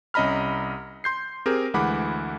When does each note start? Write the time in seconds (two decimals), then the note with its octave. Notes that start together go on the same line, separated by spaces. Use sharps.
0.14 C2 C#4 D#5 A#5 B5 F6
1.04 C6 G6 C7
1.46 C4 G4 G#4 A#4
1.74 D2 E3 G#3 F#5 B5 D6